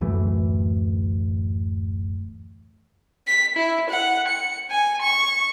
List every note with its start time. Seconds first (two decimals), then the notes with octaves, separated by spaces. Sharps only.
0.01 D1 F#2 E3 A3
3.27 B6
3.57 E4
3.90 F#5
4.28 C#7
4.71 G#5
5.02 C#6